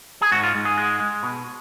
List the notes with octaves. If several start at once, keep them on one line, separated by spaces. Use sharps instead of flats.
G#4
G#2 F#4
F4
G#2
G#4
G#3
G#3
B2